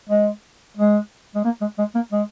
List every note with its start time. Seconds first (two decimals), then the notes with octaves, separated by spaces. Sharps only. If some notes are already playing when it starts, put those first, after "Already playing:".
0.09 G#3
0.77 G#3
1.35 G#3
1.45 A#3
1.61 G#3
1.78 G#3
1.95 A#3
2.12 G#3